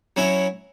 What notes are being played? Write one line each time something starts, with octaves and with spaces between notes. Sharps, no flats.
F#3 C#4 E4